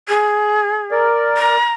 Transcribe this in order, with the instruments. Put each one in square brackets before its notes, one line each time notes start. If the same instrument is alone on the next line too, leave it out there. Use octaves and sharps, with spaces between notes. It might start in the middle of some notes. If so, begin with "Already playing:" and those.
[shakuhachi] G#4
[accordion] A#4 D5
[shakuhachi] A#5